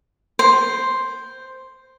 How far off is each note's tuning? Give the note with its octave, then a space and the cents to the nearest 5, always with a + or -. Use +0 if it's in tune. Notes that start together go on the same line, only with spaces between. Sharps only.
C5 +0